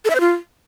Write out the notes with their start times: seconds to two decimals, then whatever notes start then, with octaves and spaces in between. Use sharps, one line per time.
0.05 A4
0.10 E5
0.15 C5
0.20 F4